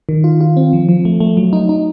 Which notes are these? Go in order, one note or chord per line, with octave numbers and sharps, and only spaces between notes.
D#3
F4
F4
C4
F3
F3
A3
A3
F#3
D#4
D#4